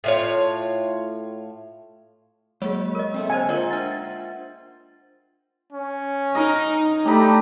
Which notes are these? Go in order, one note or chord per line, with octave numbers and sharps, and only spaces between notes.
A2 F4 C#5
F#3 G#3 A#3 G#4 C#5
A#4 D#5
C4 A4 E5
D3 C5 D#5 G5 G#5
F4 A#4 C5 D#5 E5 F#5
D4 A6
C#4
D#4 A#4 D#5
A3 D4 D#4 G4 B5